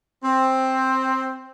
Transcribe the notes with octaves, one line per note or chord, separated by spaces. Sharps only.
C4